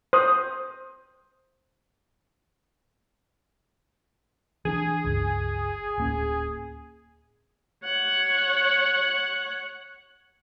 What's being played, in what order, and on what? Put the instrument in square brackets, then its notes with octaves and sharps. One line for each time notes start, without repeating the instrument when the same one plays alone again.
[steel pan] C5 D#6
[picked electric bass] E3 C4 D4 [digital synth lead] G#4
[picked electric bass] G1 C#2
D1 A#3 C#4
[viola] C#5 F#5